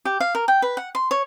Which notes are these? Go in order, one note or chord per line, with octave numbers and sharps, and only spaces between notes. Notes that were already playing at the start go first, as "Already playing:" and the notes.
G4
F5
A#4
G5
B4
F#5
C6
C#5